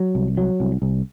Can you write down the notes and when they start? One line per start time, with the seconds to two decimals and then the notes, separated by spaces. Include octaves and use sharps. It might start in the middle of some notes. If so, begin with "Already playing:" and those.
Already playing: F#3
0.15 C2
0.37 F#3
0.60 C2
0.82 C2